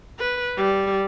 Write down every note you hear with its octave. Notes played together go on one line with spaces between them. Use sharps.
B4
G3